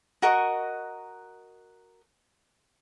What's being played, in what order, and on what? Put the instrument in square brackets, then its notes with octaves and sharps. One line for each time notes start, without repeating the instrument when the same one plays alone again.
[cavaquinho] F#4 A#4 D#5 C#6